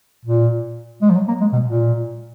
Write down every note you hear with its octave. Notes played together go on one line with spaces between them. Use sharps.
A#2
G#3
F3
F#3
A#3
G#3
B2
A#2